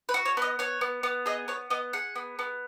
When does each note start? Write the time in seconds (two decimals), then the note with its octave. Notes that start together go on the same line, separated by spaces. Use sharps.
0.09 B4
0.14 F#4
0.25 C#5
0.37 B3 D#5
0.59 B3 C#5
0.81 B3
1.03 B3
1.26 G#4 D#5
1.48 B3 C#5
1.70 B3 D#5
1.93 G#4 F#5
2.15 B3
2.39 B3